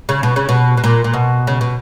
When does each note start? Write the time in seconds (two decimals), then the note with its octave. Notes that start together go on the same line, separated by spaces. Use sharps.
0.09 C#3
0.23 B2
0.36 C#3
0.49 B2
0.77 B2
0.84 A#2
1.04 A#2
1.14 B2
1.47 C#3
1.61 B2